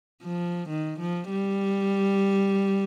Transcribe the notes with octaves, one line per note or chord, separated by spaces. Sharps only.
F3
D#3
F3
G3